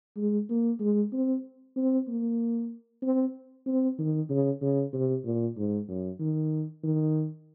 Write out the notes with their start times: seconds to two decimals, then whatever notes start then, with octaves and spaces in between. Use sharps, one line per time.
0.17 G#3
0.50 A#3
0.80 G#3
1.13 C4
1.77 C4
2.08 A#3
3.03 C4
3.66 C4
3.99 D#3
4.30 C#3
4.62 C#3
4.93 C3
5.25 A#2
5.57 G#2
5.88 F#2
6.20 D#3
6.84 D#3